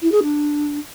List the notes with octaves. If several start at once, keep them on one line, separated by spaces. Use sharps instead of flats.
E4
G#4
D4